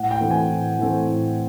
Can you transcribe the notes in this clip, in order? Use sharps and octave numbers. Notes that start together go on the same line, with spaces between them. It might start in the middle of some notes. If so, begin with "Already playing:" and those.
Already playing: A2 F#5
G5
E3 A3 C4
G#5
A2
E3 A3 C4
A2